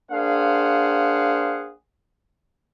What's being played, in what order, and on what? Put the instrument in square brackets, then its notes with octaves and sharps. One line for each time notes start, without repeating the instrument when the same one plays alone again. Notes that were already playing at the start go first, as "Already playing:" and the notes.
[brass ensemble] A#3 D4 G#4 C5 F5 F#5